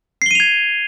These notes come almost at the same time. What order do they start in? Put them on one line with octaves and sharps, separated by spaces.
C7 G7 D#7 F7 G#6